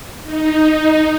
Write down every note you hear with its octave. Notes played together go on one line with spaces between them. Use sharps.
D#4
D#4